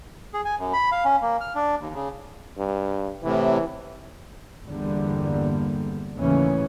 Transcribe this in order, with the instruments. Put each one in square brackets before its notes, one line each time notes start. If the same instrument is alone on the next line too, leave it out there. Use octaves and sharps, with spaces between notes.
[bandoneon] G#4
G#5
F#2
B5
F5
C#4
A#3
F6
D4
D#2
C#3
[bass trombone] G2
[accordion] A2 C3 [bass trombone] E3
[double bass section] G1 E2 D3 G3 A#3
D#2 A2 C#3 E3 C#4